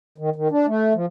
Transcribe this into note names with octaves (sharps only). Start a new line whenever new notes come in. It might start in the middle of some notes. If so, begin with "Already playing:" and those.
D#3
D#3
D4
A3
F3